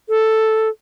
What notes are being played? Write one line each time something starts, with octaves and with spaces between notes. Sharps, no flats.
A4